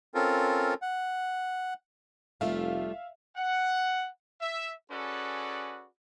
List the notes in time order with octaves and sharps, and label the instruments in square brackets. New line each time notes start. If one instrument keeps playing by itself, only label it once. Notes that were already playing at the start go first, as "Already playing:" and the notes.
[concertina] C4 C#4 F4 A4 A#4
F#5
[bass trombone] F1 [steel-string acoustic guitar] G3 A3 F4 [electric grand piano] E5 F5
[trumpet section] F#5
E5
C#4 F#4 G#4 A4 B4 D5